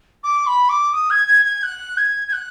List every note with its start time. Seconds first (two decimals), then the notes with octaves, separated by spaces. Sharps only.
0.24 D6
0.47 B5
0.69 D6
0.93 D#6
1.10 G#6
1.27 G#6
1.45 G#6
1.63 F#6
1.97 G#6
2.28 G#6
2.33 F#6